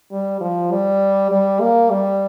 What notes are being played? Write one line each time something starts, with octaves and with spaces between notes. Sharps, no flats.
G3
F3
G3
G3
A#3
G3